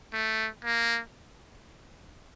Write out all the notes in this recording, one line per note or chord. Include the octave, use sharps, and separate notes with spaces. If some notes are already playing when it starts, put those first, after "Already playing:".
A3
A#3